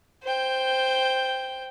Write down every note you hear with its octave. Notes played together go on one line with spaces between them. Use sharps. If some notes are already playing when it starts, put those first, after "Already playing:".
C5 G5